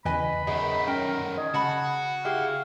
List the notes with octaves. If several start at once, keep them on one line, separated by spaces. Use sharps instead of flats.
E2 C#3 B4 D#5 G#5 B5
F#2 D#3 G#4 D#5
C#4 A#4 G5
G#4 D#5
C#3 F#4 A5 B5
E4 G4 G#4 F5